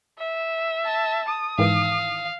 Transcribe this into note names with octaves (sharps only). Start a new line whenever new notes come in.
E5
A5
D#6
G#2 D#3 E3 F5